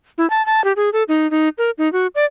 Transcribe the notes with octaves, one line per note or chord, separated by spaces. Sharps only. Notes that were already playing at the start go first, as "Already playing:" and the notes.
E4
A5
A5
G4
G#4
A4
D#4
D#4
A#4
D#4
F#4
D5